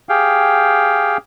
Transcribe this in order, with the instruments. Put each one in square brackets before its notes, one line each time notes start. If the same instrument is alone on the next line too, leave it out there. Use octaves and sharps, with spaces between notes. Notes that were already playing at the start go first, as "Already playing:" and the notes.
[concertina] G4 G#4 F5 G5